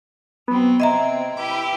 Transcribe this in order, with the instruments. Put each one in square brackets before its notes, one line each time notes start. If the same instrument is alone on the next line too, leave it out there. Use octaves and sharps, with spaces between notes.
[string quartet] F#3 C4 [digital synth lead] B3
[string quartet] C3 C4 [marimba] D#5 E5 A#5 [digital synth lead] G#6
[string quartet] E4 G4 B4 [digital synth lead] D6